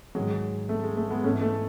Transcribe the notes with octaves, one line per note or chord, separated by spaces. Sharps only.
G#2 D#3 F#3 G#3
A3
G#3
A3
G#3 B3
G#2 E3 A3 C#4
A3